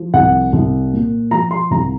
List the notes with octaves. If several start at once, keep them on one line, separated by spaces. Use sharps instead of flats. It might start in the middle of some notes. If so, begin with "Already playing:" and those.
Already playing: F3
C2 F#5
C2
A#2
F3 A#5
C6
C2 A#5